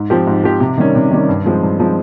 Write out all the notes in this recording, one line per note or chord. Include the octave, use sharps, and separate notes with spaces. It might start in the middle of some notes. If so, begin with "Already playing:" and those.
Already playing: G#2
F3 C4 G4
G#2
F3 C4 G4
C3
D#3 G3 C#4
C3
D#3 G3 C#4
G2
F3 G#3 C4
G2
F3 G#3 C4